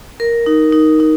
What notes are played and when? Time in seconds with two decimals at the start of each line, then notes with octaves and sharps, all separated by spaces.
0.20 A#4
0.46 D#4
0.72 D#4
1.00 D#4